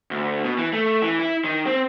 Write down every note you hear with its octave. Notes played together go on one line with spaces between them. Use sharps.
D2
B2
E3
A3
E3
E4
D#3
C4